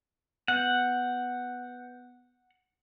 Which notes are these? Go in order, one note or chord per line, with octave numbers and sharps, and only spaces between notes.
B3 F#5 G6